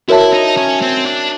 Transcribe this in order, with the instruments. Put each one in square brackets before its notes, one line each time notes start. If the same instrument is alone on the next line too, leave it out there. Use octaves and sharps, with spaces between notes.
[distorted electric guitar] E4 [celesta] F#4 A#4 C#5 E5 A5
[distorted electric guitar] D#4
C#4
C4
D4